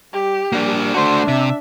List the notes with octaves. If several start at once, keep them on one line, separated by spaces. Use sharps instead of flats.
G3 G4
G3 A#3 D4
A3 D4 F#4 C5
C3 E5